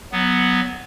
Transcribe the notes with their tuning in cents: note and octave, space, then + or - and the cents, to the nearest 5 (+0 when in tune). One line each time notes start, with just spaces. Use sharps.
F#3 +0 B3 +0